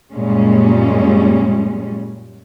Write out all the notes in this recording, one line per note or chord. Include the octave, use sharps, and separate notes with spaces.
F#2 A#2 G3 G#3 C#4